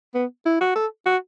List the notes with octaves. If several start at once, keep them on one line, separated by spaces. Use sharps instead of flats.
B3
E4
F#4
A4
F#4